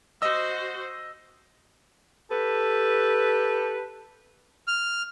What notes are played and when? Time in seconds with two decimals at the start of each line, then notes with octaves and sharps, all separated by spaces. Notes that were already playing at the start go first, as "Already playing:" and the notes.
0.22 F#4 C5 D#5 E6
2.31 G4 A4 B4
4.67 F6